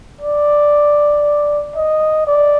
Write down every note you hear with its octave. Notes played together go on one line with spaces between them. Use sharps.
D5
D#5
D5